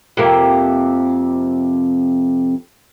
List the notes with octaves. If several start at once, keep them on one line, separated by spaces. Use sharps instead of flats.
F2 C3 A#3